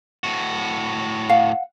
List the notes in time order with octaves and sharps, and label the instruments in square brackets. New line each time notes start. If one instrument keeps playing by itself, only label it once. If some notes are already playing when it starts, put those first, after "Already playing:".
[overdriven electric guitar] A2 F#4
[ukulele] F5 F#5